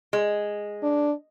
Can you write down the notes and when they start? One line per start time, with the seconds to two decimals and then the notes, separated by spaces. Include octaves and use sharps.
0.13 G#3
0.83 D4